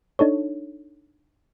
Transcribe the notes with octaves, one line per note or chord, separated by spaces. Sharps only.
D4 D#4 A4 C#5